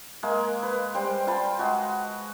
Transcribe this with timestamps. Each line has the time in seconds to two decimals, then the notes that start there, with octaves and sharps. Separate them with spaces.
0.23 G#3 A#3
0.63 B4
0.94 G3 C5 G5
1.27 F4 G5 A5 B5
1.59 G#3 F#4